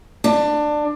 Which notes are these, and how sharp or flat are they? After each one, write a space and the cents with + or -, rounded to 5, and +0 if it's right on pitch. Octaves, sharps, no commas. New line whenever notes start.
D4 +20